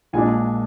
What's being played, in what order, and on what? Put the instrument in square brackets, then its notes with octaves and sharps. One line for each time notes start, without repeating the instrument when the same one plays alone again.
[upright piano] A#1 A#2 G#3 D4 G#5